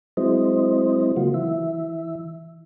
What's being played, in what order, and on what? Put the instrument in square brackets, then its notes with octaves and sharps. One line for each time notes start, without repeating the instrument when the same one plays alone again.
[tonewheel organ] F#3 G#3 C4 E4 C5 D#5
C#3 F#3 A#3 F4 F#4
E3 E5